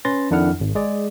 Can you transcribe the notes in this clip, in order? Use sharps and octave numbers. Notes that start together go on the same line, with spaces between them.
C#4 B4 C6 A6 A#6
F2 D#3 D4 E4 F#5 F6
G#1
G#3 G#4 D5